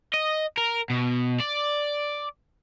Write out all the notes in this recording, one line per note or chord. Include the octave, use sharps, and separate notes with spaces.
D#5
A#4
B2
D5